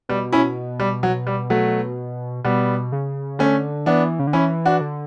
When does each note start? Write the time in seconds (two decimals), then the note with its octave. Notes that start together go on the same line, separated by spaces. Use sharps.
0.09 B2 G3
0.32 C#4 E4
0.80 G3
1.03 F#3
1.27 G3
1.50 F#3 A3
2.44 B2 G3 B3
2.92 C#3
3.39 D3 A3 C#4
3.86 E3 B3 D4
4.19 C#3
4.27 D3
4.33 E3 C#4 E4
4.65 D4 F#4
4.81 D3